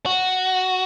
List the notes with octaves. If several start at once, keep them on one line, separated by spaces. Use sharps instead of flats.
F#4